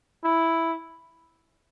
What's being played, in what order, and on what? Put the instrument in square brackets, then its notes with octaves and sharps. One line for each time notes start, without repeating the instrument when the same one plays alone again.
[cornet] E4